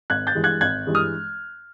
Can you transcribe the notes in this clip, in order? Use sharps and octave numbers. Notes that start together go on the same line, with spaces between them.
G#1 F#6 G#6
G6 A6
G2 E3 G#3
F#6 G#6
G#1 F#6 G#6
G2 E3 G#3
D#6 F6